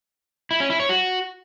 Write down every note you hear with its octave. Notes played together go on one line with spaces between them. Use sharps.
E4
C#4
E4
C#5
F#4